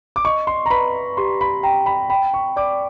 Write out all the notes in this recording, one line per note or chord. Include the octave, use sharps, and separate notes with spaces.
D6
D#5 C#6
C6
A#5
B4 B5
G4 C6
B5
G5 A#5
B5
G5 B5
C#6
D5 D6